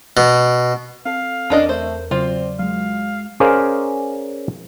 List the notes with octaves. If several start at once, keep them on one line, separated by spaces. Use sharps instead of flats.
B2
C4 A4 F5
E2 C#4 D4 A#4 D#5
A3 C5
C#3 F#3 C4 F4 D5
F#3 G#3 F5
C#4 G#4 A#4 C5 D5 F5